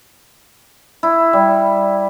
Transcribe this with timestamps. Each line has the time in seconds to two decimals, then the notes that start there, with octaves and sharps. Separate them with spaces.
1.03 E4
1.33 G3